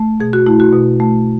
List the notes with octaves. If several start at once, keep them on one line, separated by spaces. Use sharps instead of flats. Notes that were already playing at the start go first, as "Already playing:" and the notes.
Already playing: A3
B2 G#4
F#4
A3 E4
F#4
B2
A3